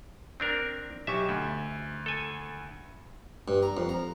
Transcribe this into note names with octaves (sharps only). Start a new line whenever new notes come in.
C4 D4 A#4
B1 G4 E5 C#6
D2
A4 G#5
G2
A#5
F2
A#5